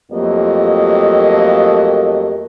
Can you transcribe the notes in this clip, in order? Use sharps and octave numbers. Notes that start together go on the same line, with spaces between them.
F2 F#3 A3 A#3 G4 D#5